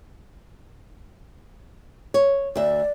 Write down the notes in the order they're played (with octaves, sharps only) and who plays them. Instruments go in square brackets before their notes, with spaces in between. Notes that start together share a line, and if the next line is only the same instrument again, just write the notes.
[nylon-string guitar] C#5
[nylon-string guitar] D2 E5 [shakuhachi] D5